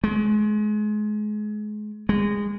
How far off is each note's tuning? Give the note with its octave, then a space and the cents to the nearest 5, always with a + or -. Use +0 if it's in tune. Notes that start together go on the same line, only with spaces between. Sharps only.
G#3 +30
G#3 -20